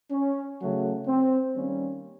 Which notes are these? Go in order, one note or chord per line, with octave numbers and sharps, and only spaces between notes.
C#4
C#3 F#3 A3
C4
D#3 G3 A#3 C#4